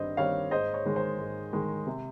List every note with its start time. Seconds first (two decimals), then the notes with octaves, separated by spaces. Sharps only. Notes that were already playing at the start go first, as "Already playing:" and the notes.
Already playing: G2 D#3 G3 C4 C5 D#5
0.17 D#3 G3 C4 C#5 F5
0.51 G#2 C5 D#5
0.74 C#5
0.86 D#3 G#3
0.96 C5
1.19 G#2
1.53 D#3 G#3
1.87 C3